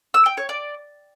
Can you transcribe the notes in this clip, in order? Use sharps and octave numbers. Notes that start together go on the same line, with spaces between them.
E6
G5
C#5
D5